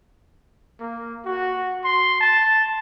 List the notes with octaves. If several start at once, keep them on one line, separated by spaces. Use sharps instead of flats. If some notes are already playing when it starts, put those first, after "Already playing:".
A#3
F#4
C6
A5